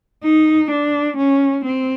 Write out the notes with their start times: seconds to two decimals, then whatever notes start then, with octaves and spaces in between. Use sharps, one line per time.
0.24 D#4
0.71 D4
1.17 C#4
1.65 C4